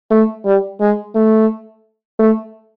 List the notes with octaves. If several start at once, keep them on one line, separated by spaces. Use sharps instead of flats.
A3
G3
G#3
A3
A3